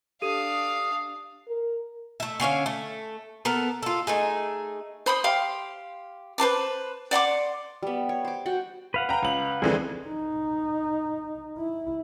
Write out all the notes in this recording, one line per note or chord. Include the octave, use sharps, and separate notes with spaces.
D4 G4 A4 F5 D#6 D#7
A#4
A3 E5
D3 C#4 C#5 F5
A3
B3 A4 A#4
F4 A4
A3 D#4 G#4
C5 B5 C6 D#6
G4 F5 C6
B4 C5 A5 D6
D5 F#5 C6 D6
G3 B3
C#5
C5 D6
F#4 F#5 G5
B4 F5 F#5
G5 A#5
C#2 F#7
F2 D3 E3 G#3 C4 G#4
D#4
E4